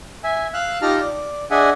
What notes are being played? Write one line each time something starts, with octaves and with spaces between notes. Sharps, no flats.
E5 G#5
F5 E6 F#6
D#4 F4 G4 A5 A#5 F6
D5
D4 G#4 D#5 E5 F#5 G#5